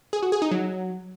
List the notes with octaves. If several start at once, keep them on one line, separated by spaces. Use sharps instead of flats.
G#4
F#4
G#4
D#4
F#3